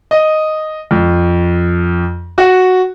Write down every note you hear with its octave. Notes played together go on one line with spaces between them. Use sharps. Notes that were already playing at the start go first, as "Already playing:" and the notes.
D#5
F2
F#4